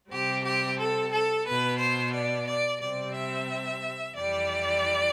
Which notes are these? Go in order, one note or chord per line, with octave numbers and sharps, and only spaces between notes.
C3 G3 C4 G4
G4
A4
A4
B2 B3 B4
C5
D5
D5
C3 G3 C4 D5
E5
F2 E3 G3 D5